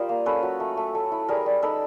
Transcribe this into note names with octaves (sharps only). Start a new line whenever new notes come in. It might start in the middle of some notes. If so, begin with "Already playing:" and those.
Already playing: G3 F4 A#4 C5 D#5 F5
A#3
C#4 A4 B4
F#3
A3
A3
A3
E4
G3 G#4 A#4
G3
D#4 A4 B4